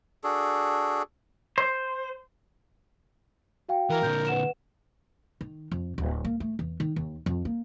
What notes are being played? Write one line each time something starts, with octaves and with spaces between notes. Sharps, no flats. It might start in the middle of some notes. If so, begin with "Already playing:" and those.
D4 F#4 G#4 A4
C5
F#4 F5 G5
E3 A#4
A#2 D3 G6
B4 F#5 E7
D#3
F2
D1
A#3
A3
E2
D#3
D#2
F2
A#3